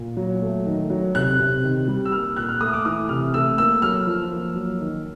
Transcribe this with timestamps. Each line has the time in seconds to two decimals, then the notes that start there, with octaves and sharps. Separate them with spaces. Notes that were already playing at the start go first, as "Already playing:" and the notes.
Already playing: A#2
0.17 F#3
0.42 A3
0.66 D#3
0.90 F#3
1.15 C3 F#6
1.39 C3
1.63 D#3
1.88 G3
2.05 E6
2.12 A#3 F6
2.37 A#2 F#6
2.49 F6
2.61 A3 D#6
2.73 D6
2.85 E3 D#6
3.09 C3 F6
3.34 A3 E6
3.58 A#3 E6
3.82 F#3 F6
4.07 F3
4.31 A#3
4.56 F#3
4.80 D#3